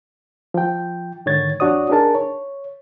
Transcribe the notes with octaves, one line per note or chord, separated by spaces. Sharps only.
F3 G5
G#2 D3 D#3 C#5 G#6 A6
F2 D4 F#4 C#5 D5 D#6
D4 D#4 G#4 A#4 A5
C#5